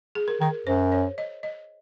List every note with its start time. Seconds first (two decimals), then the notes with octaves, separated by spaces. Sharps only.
0.15 G#4
0.28 A#4
0.41 D#3 A#4
0.67 F#2 C5
0.92 C#5
1.18 D#5
1.43 D#5